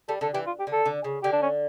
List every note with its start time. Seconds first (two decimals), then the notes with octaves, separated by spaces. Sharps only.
0.09 G3 A4
0.21 D3 A4
0.34 E3 G4
0.47 F4
0.60 G4
0.67 D3
0.72 A4
0.86 D3
1.04 C#3
1.23 D3 G4
1.33 D4
1.42 C#4